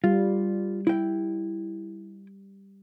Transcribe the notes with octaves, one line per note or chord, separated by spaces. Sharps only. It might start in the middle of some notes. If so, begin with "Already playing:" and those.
G3 F4
E4 G5